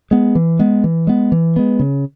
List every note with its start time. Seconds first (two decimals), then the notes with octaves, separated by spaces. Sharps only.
0.11 G#3 B3
0.35 E3
0.59 G#3 B3
0.84 E3
1.07 G#3 B3
1.32 E3
1.56 G#3 B3
1.79 C#3